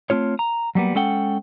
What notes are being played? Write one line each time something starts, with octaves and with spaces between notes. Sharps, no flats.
A3 C4 F4 C#5
A#5
F#3 G3 A#3 B3
G#3 C#4 A4 F#5 G5